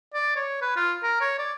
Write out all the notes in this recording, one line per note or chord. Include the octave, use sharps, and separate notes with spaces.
D5
C#5
B4
F4
A#4
C#5
D5